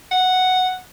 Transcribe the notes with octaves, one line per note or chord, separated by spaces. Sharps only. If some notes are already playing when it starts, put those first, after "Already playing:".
F#5